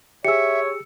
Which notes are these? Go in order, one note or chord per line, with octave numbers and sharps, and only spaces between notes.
G4 G#4 C#5 E5 E6 C#7